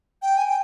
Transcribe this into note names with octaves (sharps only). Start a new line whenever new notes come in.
G5
G#5
G5